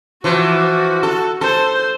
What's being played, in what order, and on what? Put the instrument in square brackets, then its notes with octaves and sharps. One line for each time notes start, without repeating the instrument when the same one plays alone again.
[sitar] E3 F3 [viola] F#4
[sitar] A4
[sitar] A4 [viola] C5